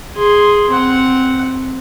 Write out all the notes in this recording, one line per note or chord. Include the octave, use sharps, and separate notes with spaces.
G#4 C6
C4 F#5